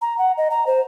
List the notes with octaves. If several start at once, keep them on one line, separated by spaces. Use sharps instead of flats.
A#5
F#5
D#5
A#5
C5